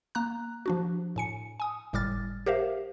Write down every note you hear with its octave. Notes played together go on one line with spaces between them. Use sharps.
A#3 A#5 F#6
F3 D4 F#4
A2 G#5 C#7
G#5 D#6
G1 A2 G3 D6 F6 A6
G4 A#4 C5 E5 F5